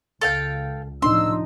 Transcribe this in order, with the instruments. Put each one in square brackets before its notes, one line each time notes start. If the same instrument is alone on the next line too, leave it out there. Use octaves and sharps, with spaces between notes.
[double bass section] C#2 [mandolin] A4 F5 G5
[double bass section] A2 C3 F3 [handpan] D4 D#4 D#5 [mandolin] C6 [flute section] E6